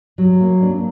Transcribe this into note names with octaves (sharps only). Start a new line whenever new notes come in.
F#3
A#3
D4